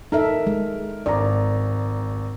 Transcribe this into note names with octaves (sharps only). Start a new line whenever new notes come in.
D#4 A4 A#4 E5
G#3
G#1 D5 A#5